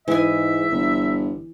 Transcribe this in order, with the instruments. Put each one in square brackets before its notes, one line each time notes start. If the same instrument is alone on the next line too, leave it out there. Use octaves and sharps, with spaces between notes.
[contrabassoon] G#2 [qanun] E3 G#5 [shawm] E5
[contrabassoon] G1